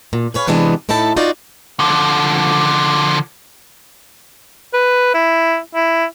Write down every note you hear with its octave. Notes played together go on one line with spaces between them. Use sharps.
A#2
G#4 B4 C#5 F5
C3 E3 G#3 B3 D4
A2 D#4 E4 A4 A5
D#4 F4 F#4 D5
D3 F3
B4
E4
E4